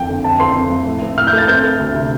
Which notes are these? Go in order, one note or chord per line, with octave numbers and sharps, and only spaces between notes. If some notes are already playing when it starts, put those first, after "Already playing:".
Already playing: F2 F3 G5
D3
F2 A5
C4 C6
F2
F3
A2
C4
A2 F6
G6
A3
A6
C4 G6
A3
D2
C3